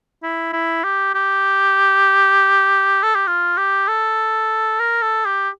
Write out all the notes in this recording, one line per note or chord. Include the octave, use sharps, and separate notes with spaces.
E4
E4
G4
G4
A4
G4
F4
G4
A4
A#4
A4
G4